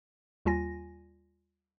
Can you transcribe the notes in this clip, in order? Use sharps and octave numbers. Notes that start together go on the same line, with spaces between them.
D#2 G3 F4 G#5 A#6